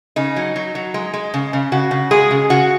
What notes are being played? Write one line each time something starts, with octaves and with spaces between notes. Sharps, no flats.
C#3 D#4
F#3
F#3
F#3
G#3
G#3
C#3
C#3
C#3 F#4
C#3
G#3 G#4
C#3
C#3 F#4